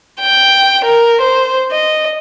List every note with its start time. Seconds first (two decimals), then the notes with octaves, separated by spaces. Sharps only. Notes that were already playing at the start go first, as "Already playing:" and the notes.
0.21 G5
0.85 A#4
1.21 C5
1.71 D#5